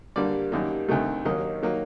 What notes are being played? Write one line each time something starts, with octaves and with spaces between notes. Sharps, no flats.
G2 D3 G3 A#3 D5
F#2 D#3 G3 A#3
D2 C3 D#3 A3
D#2 D#3 F#3 A#3 D#5
D#3 F#3 A#3